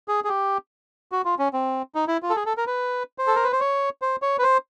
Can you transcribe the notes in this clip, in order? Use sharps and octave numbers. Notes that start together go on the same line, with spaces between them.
G#4
G#4
G4
F#4
F4
C#4
C4
D#4
E4
F4
A4
G#4
A4
A#4
B4
C5
A4
A#4
B4
C5
C#5
C5
C#5
B4
C5